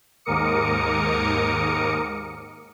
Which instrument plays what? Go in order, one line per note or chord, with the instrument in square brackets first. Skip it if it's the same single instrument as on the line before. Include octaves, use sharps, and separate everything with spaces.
[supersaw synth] D#2 G#2 A#4 D6 D#6 C#7